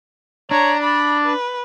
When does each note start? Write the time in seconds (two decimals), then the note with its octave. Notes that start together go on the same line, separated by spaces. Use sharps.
0.51 D4 C#5 A#5
0.83 D5 B5
1.26 B4